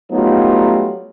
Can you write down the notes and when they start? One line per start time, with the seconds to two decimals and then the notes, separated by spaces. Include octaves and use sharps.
0.11 F#3 G3 A3 B3 D#4 F4